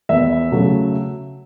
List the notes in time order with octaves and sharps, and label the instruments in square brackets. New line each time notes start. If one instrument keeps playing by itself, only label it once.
[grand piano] E2 [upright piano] E5
[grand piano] C#3 F#3 A3